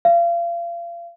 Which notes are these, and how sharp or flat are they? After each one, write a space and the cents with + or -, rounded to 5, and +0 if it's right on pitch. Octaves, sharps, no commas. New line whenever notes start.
F5 -35